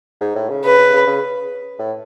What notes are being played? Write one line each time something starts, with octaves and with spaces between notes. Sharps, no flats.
G#2
A2
C#3
C#3 B4
C#3
C#3
C#3
A2